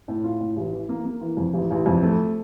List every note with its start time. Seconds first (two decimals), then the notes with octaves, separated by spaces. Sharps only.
0.08 A2
0.24 F4
0.40 A2
0.56 A1
0.73 E3
0.89 A#3
1.05 A#3
1.21 E3
1.37 F2
1.53 A1
1.71 A1
1.86 F2
2.03 A3